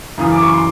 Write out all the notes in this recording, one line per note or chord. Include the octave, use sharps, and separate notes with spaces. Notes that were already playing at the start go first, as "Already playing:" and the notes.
F#2 C#3 E3 D#6
D6
C#6
C6